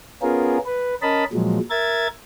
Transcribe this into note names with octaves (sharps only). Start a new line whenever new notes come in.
B3 C#4 F4 G#4 A#4
B4
C#4 A#4 D#5 A5 B5
A#2 F3 F#3 G#3
A#4 E5 G#6 A6